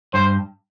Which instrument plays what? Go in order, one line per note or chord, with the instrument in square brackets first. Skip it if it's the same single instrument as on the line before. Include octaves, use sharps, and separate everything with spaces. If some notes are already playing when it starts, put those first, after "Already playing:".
[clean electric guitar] G2 [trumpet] C5